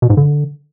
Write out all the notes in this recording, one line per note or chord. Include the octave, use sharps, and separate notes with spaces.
B2
G#2
D3